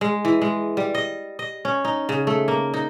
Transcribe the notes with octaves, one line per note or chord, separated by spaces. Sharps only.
G#3
E3
G#3
G3
D#5
D#5
C#4
D#4
C#3
A3
A#3
D#4